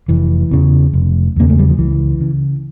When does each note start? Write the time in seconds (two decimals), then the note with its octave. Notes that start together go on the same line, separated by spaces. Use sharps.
0.08 F1 E3
0.51 E2 C#3
0.93 F1
1.36 E2 C#3 A#3
1.49 A3
1.59 G3
1.69 F3
1.78 C#2 E3
2.21 C#3